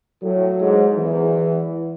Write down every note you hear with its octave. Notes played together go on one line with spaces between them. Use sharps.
A2 F#3
G#2
E2 E3